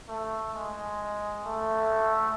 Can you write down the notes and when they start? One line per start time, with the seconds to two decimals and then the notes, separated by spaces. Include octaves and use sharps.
0.09 A3
0.55 G#3
1.46 A3